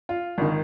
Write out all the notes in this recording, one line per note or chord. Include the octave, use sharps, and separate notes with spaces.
F4
G#1 D#3